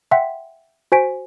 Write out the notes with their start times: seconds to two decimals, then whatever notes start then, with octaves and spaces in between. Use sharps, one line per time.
0.11 E5 F#5 G5 C6 B6
0.92 F#4 C5 G#5 B6 D7